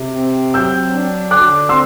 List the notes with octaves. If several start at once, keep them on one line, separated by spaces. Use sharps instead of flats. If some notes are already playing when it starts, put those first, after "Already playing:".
Already playing: C3
C4
F#3 E6 G6
D4
D3 D6 F#6
C4 C6 E6